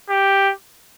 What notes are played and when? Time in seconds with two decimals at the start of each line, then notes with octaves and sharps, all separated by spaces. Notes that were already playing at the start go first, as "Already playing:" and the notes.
0.10 G4